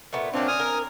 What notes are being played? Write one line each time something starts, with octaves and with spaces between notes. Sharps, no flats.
A#2 A3 B3
A#2 F#3 C4 D4 F4
G#5 D#6 F6
A#4